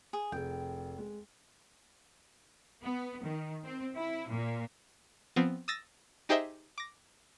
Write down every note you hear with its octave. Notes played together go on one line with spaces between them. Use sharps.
G#4
F1 G#4 G5
G#3
B3
D#3
C4
E4
A#2
F3 B3 C4
D#6 E6 A6 A#6
D#4 G4 G#4 C5 D#5 E5
D6 A#6